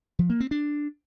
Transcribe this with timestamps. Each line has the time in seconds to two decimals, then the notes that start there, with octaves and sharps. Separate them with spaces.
0.19 F3
0.30 A#3
0.40 C4
0.51 D4